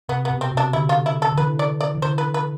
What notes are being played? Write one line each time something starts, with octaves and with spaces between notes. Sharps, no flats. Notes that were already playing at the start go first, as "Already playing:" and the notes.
C3 B3
B3
B2
C4
C3
D4
D3 E4
F4
E4
A4
D3
E3 B4
D5
D5
E3
D3 C5
B4
B4